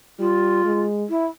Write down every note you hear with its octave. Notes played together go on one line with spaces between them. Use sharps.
G3 F4
G#3
E4